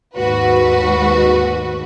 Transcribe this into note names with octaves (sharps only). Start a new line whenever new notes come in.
D#2 G#2 F#4 B4